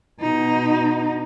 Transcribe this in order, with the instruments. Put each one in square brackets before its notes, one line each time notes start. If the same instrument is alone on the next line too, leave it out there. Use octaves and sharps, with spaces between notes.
[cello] B2 D#4